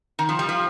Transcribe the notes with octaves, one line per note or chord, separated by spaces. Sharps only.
D#3
F3
G3
F3